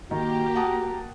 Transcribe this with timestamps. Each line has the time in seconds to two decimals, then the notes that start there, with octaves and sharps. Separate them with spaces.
0.11 D#3 A#3 F#4 G4 A#5
0.55 F#5 A5 D#6